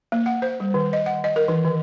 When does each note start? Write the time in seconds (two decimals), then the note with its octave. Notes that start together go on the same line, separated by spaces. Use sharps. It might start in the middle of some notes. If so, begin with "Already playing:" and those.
0.12 A#3
0.26 F#5
0.42 C5
0.60 G3
0.74 D#3
0.93 D#5
1.06 F#5
1.24 D#5
1.36 A#4
1.48 E3
1.65 D#3